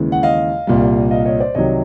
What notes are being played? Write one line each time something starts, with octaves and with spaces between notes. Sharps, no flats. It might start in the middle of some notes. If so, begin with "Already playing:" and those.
Already playing: D#2 C#3 E3 G#3
F#5
D#5 F5
C2 A#2 G3
D#5 F5
C#5 D#5
C5 D5
C2 C3 D#3 F#3 C#5 D#5